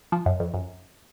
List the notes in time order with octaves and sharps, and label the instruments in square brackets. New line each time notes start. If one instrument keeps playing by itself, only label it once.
[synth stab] F3
F#2
F2
F#2